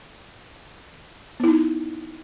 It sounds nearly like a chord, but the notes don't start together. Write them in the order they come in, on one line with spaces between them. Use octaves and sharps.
B3 E4 D#4